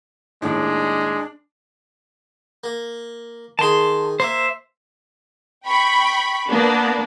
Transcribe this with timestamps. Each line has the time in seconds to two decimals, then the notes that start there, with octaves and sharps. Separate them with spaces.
0.42 D#2 A2 G#3 D4
2.64 A#3
3.59 D#3 G#4 A5 C6
4.20 A#3 C5 E5
5.66 G5 B5 C#6
6.50 A#3 B3 D4